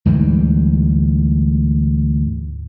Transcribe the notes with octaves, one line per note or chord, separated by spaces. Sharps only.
D2 G#2 E3 G3